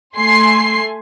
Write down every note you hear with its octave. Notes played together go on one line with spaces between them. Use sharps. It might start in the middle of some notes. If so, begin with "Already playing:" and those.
A3 G#5 C6 C7